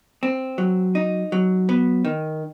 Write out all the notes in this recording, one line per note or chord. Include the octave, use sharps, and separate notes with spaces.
C4
F#3
D#4
F#3
B3
D#3